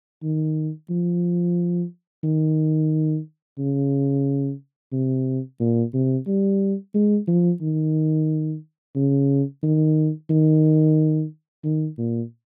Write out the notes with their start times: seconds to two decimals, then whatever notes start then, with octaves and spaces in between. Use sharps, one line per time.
0.23 D#3
0.90 F3
2.24 D#3
3.59 C#3
4.92 C3
5.60 A#2
5.94 C3
6.27 G3
6.94 G#3
7.28 F3
7.62 D#3
8.96 C#3
9.63 D#3
10.30 D#3
11.64 D#3
11.98 A#2